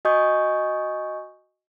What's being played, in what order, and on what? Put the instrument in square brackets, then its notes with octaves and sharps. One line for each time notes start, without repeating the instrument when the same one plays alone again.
[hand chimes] F#4 D#5 G#5 C#6 D#6 G6